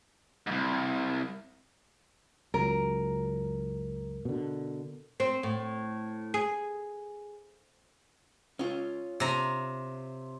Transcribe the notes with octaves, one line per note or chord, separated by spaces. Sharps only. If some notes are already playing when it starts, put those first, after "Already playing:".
C2 G#2
C#2 F#2 A#4
B2 D3
C4
A2
G#4
C#4 F4
C3 A#5